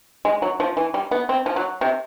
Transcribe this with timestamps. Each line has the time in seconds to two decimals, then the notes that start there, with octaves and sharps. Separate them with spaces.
0.25 G#3
0.42 F#3
0.60 F3
0.77 E3
0.94 G3
1.11 B3
1.29 C4
1.46 F3
1.56 F#3
1.81 C3